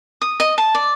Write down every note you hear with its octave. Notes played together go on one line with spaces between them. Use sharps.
D#6
D#5
A5
D5